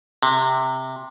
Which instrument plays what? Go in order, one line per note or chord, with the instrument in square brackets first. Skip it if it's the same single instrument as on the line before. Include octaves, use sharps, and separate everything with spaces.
[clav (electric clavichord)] C3